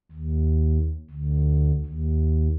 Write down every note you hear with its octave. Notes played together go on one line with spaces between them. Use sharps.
D#2
D2
D#2